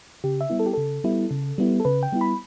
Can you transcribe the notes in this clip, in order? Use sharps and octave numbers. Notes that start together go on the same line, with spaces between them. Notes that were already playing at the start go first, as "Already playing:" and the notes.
C#3 G4
E5
G3 B3 E4
A4
G4
C#3 A4
G3 B3 E4
C#3
G3 B3 E4
A4
C#3 B4
G5
G3 B3 E4
B5